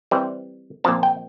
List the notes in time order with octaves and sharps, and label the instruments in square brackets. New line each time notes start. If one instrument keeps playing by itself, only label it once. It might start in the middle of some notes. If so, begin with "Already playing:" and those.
[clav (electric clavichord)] E3 G3 C4
A#2 F3 C4 A5
G5